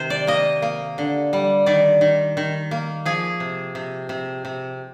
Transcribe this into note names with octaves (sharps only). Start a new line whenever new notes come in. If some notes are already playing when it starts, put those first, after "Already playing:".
Already playing: C3 D#3 C5
D5
A#3 D#5
A#3
D3
G3
D#3 D5
D#3
D#3
A#3
F3 G#4
C3
C3
C3
C3